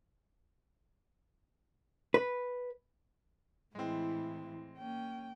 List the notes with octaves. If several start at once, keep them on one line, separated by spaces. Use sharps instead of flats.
B4
A2 E3 G#3 C4 E4
A#3 C#4 G5